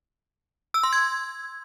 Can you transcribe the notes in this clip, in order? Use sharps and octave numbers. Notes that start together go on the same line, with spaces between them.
E6
C6
G#6